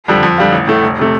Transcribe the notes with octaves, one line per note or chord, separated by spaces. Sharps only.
F2 D3 G3
F2
D3 G3 F4
A1
A2 A3
F1
C3 A3